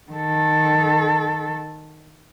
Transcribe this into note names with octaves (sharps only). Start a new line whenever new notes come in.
D#3 A4